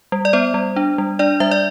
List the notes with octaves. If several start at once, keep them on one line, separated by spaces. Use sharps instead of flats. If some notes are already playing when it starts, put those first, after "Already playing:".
G3
D5
B3 C5
G3
D4
G3
D4 D5
G3 E5
D5